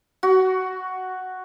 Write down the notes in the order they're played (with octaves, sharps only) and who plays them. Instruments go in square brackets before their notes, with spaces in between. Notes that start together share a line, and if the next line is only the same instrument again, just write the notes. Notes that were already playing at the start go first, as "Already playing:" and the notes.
[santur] F#4